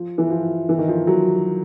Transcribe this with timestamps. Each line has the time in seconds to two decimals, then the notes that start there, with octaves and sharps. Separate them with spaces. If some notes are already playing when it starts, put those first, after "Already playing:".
Already playing: F3
0.18 E3
0.30 F3
0.69 E3
0.78 D#3
0.88 F3
1.07 F#3